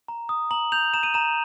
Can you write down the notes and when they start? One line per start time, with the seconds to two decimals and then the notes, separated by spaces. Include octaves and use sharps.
0.08 A#5
0.29 D#6
0.51 A#5 F#7
0.72 G6 F7
0.94 A#5 E7
1.03 D#7
1.14 A#5 E7